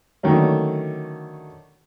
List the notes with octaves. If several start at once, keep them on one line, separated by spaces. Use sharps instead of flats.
D3 D#3 F#3 A3 C#4